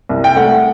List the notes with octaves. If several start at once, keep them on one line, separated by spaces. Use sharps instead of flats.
C2
G5
A3 F#5